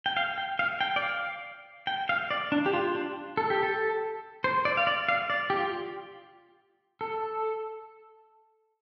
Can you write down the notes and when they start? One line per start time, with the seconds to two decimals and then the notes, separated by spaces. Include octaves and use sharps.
0.06 G5
0.17 F5
0.38 G5
0.59 F5
0.81 G5
0.96 D5
1.02 F5
1.87 G5
2.09 F5
2.31 D5
2.52 D4
2.66 G4
2.73 F4
2.95 D4
3.37 A4
3.50 G4
3.63 A4
4.44 C5
4.65 D5
4.77 F5
4.87 D5
5.09 F5
5.30 D5
5.50 G4
5.58 F4
7.01 A4